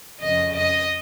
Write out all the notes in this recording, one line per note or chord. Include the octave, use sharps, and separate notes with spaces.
F2 C#3 D#5
D#5